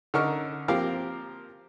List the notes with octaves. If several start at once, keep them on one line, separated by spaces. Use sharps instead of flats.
D3 C#4 D#4 A#4 C#6 F6
F3 A#3 C4 G4 A#4 F5